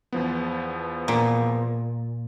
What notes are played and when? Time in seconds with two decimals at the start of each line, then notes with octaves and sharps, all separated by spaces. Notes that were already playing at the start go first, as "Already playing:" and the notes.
0.12 E2 F3 B3
1.08 A#2